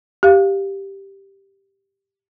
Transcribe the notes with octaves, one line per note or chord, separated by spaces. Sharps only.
G4 F5